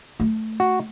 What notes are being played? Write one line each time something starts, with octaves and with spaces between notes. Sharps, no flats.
A3
F#4